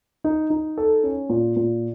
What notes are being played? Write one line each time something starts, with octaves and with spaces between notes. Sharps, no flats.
D#4
D#4
A4
C#4
A#2
A#2